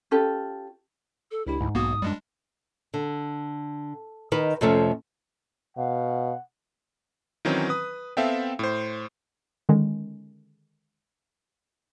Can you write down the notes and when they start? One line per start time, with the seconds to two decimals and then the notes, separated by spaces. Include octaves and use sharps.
0.11 C#4 F4 G4 A4
1.31 A4
1.47 C#2 D4 E4 G4
1.61 D2 G#2
1.75 B1 A#3 B3 F#4 D#6
2.02 F#2 G3 G#3 D4
2.94 D3
4.32 D#3 D#4 B4
4.61 F2 C3 F3 A3 C#4
5.77 B2 F5 F#5
7.45 D#3 E3 F#3 C4 C#4 D#4
7.69 B4 D#6
8.17 B3 C4 A4 E5 F5 G5
8.59 A2 C5
9.69 D3 D#3 G#3 C#4